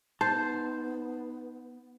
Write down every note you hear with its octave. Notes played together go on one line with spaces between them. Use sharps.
B3 D#4 C5 A5